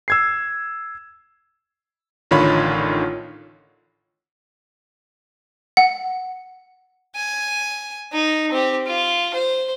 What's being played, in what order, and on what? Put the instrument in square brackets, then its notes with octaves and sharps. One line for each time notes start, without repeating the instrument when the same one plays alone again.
[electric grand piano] E6 G#6 C7
A1 D3 D#3 F4 C#5 B5
[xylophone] F#5
[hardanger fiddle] G#5
D#4
C4 G4
F4
C5